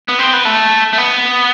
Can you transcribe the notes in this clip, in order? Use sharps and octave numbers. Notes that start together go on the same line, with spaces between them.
B3
C4
B3
A3
A3
B3